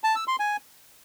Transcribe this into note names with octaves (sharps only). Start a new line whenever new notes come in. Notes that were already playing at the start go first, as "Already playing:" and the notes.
A5
E6
C6
G#5